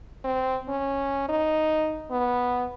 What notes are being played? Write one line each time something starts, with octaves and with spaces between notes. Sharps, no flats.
C4
C#4
D#4
B3